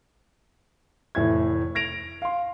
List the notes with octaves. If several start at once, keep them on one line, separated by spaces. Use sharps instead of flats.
F1 A2 E3 E5 G#6
G#6 A#6 D7 F7
F5 C6